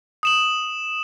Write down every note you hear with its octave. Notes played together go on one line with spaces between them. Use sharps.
D#6 E7 F#7